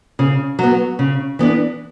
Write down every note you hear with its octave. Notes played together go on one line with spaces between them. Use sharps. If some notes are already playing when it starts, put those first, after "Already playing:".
C#3
F#3 B3
C#3
E3 B3 D4